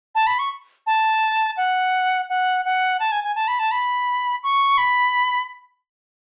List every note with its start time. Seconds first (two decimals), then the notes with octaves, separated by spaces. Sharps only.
0.15 A5
0.27 B5
0.39 C#6
0.87 A5
1.57 F#5
2.29 F#5
2.65 F#5
3.00 A5
3.12 G#5
3.24 G#5
3.35 A5
3.48 B5
3.59 A5
3.71 B5
4.43 C#6
4.78 B5